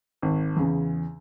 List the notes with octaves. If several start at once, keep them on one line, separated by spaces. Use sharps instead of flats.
G#1
E2 C#3